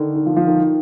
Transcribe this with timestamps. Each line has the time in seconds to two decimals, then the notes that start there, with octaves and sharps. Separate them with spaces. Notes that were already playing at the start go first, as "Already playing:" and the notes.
Already playing: D3 D#3
0.16 D#3
0.26 F3
0.36 F3
0.47 D#3